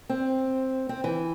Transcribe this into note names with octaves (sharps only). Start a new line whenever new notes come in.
C4
C4
E3